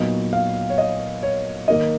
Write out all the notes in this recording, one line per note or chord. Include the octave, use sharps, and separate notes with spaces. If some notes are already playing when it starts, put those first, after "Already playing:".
Already playing: A#2 F#3 B3 D#4 D#5
F5
C#5
D#5
C#5
D#3 A#3 D#4 D#5